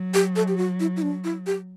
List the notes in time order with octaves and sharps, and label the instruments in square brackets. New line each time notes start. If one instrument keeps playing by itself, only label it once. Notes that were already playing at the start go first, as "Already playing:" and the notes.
Already playing: [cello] F#3
[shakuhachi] G4
A4
G4
F#4
E4
E4
D4
E4
G4